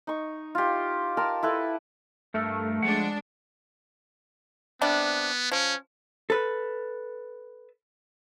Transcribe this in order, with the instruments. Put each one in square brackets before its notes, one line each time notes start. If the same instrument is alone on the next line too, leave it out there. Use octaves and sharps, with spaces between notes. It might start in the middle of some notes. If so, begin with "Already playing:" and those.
[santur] D#4 C#6
F4 G4
A#4 G5 A5 C6
E4 A4 B4
[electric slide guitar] G2 A4 A#4 [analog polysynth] A3
[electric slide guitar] F3 F#5 [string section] G#3 D4
[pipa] C3 G3 D4 [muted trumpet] B3
[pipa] F3 [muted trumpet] C#4
[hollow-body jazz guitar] A4 B4